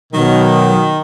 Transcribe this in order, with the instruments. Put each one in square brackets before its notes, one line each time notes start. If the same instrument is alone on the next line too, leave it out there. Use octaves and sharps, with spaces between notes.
[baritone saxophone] B2 [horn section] D#3 [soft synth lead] F#3